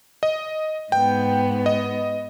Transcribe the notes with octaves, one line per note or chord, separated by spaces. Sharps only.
D#5
G#2 B3 G5
D#5